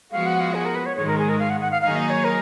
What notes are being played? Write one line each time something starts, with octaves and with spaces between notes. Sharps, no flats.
F3 G#3 B3 F#4 F5
F#5
F5
G#4
A#4
B4
C#5
G#2 D#3 G#3 C#5
A#4
G#4
A#4
F5
F#5
F#5
F5
D#3 F#3 A#3 D#4 G#4 F5
D#5
C#5
A#4